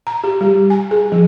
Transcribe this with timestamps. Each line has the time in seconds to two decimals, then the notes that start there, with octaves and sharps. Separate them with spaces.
0.07 A#5
0.24 G4
0.41 G3
0.70 G#5
0.91 G#4
1.12 F3